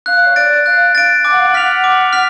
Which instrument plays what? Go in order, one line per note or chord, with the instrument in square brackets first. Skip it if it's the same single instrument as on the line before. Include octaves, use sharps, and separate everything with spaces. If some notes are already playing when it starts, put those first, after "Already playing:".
[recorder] F5 [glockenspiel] F#6
[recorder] C#5
[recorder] D5 [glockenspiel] A6 D7
[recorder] F5 [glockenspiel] F#6
[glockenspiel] A6 D7
[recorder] G#5 [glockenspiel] D6
[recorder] F#5
F5
F#5
[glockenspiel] F6 B6 F7
D6
F6 B6 F7